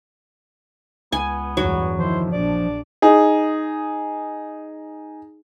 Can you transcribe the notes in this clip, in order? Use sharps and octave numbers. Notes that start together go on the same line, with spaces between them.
C#2 B3 G#5
E2 G2 F#3
D#3 F3 E4 C5
A#1 D4 D5
D#4 G#4